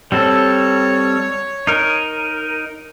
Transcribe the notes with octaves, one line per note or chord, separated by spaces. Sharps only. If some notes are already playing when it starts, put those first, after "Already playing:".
G3 C4 A4 C#5
D#4 A#4